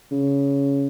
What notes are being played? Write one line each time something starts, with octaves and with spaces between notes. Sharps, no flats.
C#3